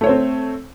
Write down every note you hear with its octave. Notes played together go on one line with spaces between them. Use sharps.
A3 C4 C5 C#5